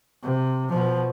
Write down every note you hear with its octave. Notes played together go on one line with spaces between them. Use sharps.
C3
B2 F3